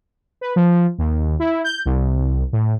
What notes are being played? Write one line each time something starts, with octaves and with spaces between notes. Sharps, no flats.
B4
F3
D#2
E4
G6
C2
A2